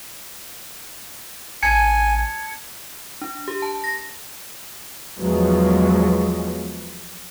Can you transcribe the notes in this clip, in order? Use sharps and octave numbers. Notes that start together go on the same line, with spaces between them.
A1 G#5 A5 G#6 C#7
D4
G4
A5
A#6
E2 F3 F#3 G#3